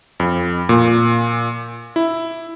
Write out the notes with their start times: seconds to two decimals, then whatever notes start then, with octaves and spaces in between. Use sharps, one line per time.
0.20 F2
0.69 A#2
1.96 E4